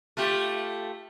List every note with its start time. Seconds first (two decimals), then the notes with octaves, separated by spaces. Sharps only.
0.17 A3 F4 G4